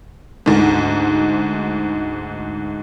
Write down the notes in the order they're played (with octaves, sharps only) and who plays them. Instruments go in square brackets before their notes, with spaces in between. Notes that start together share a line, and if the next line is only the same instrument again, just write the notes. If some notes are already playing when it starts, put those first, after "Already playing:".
[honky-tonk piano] D2 G#2